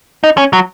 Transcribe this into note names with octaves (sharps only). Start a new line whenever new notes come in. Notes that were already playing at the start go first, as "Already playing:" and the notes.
D#4
C#4
F#3